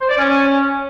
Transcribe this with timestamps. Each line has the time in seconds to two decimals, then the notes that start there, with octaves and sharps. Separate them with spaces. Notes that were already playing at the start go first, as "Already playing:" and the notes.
0.01 C5
0.09 D5
0.17 C#4